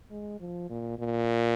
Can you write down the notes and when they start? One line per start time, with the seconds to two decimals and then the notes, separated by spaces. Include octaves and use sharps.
0.11 G#3
0.40 F3
0.70 A#2
0.99 A#2